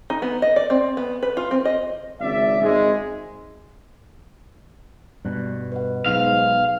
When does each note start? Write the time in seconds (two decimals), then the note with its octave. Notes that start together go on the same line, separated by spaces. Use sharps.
0.10 D#4
0.22 B3
0.42 D#5
0.56 D5
0.70 C4
0.97 B3
1.23 B4
1.37 F4
1.51 C4
1.65 D#5
2.21 G#1 C#2 D5 E5
2.62 G#1 G#3
5.25 G2 B2 D5 F#6
5.72 B4 D#5 F#5
6.06 B1 G#2 F5